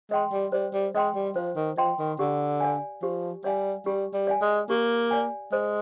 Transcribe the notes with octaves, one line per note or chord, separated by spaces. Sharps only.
G#3 D#5 G5 C6
G3
G3 C5
G3
G#3 D#5 G5 C6
G3
F3 C5
D#3
F3 D#5 G5 C6
D#3
D3 G4
D5 F5 G#5
F3 G4
G3 D5 F5 G#5
G3 G4
G3
D5 F5 G#5
G#3
A#3 G4
D5 F5 G#5
G#3 C5